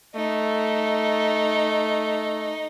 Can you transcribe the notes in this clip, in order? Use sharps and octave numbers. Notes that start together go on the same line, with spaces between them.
A3 D#4